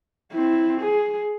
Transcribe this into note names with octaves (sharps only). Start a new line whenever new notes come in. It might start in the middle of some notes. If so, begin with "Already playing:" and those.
C4 E4
G#4